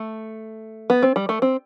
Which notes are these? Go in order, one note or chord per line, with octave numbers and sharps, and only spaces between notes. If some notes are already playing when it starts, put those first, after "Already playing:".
Already playing: A3
B3
C4
G3
A3
C4